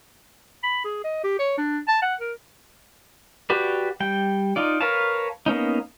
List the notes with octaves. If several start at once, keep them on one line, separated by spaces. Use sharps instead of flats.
B5
G#4
D#5
G4
C#5
D4
A5
F#5
A#4
F#4 G4 B4 D5
G3 G5
D#4 F4 D5
A#4 B4 C#5 F5 A5
A#3 B3 C#4 D#4